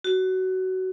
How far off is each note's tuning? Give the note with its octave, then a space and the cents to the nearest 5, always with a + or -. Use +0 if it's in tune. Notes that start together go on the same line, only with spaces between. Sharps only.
F#4 +20